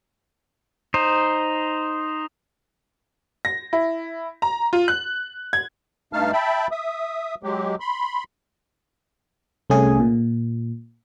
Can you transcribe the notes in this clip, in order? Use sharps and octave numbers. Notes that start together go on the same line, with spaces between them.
D#4 C5
A#6
E4
A#5
F4
F#6
G#6
G2 A3 D#4 F5 A5 F6
E5 G5 A5 B5
E5 D#6
F#3 G#3 G4
B5 C6
C2 A3 C#4 G#4 G#5
A#2